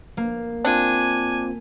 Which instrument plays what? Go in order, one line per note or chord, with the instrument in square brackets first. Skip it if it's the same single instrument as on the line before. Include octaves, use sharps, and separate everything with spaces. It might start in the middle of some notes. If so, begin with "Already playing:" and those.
[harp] A#3
[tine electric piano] C4 F4 [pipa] D4 [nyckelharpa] G#5